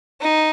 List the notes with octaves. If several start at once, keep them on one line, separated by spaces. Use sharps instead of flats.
D#4